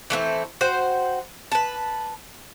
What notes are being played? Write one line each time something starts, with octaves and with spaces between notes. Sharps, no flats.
E3 A3 B3 C4
F#4 C5 G5
B4 A5